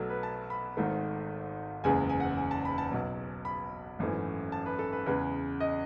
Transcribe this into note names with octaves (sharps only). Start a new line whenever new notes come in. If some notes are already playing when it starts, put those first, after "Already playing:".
Already playing: B1 B2 F#3 A3 A4
B4
A5
B5
G#1 G#2 D#3 A3
F#1 E2 C#3 G#3 G#5
G#5
F#5
G#5
A5
B5
A5
B1 B2 F#3
B5
G#1 F#2 E3 A3
A5
B4
A4
B4
E2 C#3 G#3 B4
D#5